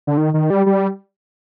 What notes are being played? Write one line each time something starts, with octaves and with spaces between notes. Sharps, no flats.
D3
D#3
D#3
G3
G3